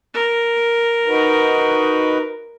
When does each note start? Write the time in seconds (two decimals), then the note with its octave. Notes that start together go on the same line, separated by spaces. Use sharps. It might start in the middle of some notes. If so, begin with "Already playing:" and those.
0.14 A#4
1.07 D#4 F#4 B4